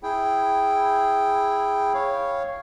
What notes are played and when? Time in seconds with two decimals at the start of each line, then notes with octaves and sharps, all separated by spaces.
0.03 E4 G#4 G5
1.94 C#5 F5